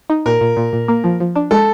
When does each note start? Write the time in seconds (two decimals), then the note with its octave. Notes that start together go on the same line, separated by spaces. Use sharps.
0.10 D#4
0.26 A#2 A#4
0.41 A#2
0.57 A#2
0.73 A#2
0.88 A#3
1.04 F3
1.20 F3
1.36 D4
1.51 G#3 A4